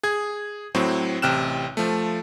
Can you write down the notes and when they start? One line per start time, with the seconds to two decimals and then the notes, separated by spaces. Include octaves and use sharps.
0.03 G#4 G#6
0.75 A2 F#3 C4
1.22 A1 C3 G5 F6 F#6 E7
1.77 F3 A3